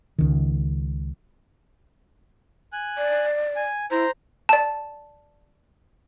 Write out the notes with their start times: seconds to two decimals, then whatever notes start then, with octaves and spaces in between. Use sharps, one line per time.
0.19 C#2 D#3
2.73 G#5 F#6
2.97 D5
3.56 G#5
3.91 E4 C5 A#5
4.49 D5 A5